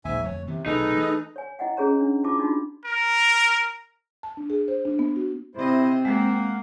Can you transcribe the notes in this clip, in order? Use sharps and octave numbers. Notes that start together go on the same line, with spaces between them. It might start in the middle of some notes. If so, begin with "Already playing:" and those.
A#1 D#2 G#2 E5 G#5
F2 D3 A3 C#5
C3 D#3 E3 B3
B1 C3 A3 D#4 G#4 A4 B4
E3 A3
C#5 G#5
E4 D#5 F#5 G5
C#4 G#4 C#5 A#5
D4
E4 F4 A5 D6
D4 D#4 F4 F#4
A#4
A5
D4
G#4
C5
D4
B3
F#4
C3 C4 E4 C5 D#5
G#3 A#3 F5 F#5